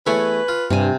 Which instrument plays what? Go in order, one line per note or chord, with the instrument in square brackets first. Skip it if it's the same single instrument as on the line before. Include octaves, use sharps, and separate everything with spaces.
[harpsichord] E2 A3 E4 [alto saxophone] B4 [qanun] C#5 G#5
[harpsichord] F4
[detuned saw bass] G2 [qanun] C3 G#5